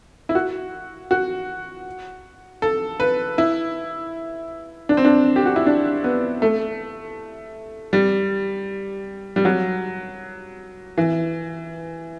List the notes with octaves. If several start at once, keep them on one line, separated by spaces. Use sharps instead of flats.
E4
F#4
F#4
A4
B4
E4
D4
C4
D4
G4
F#4
E4
D4
B3
A3
G3
G3
F#3
E3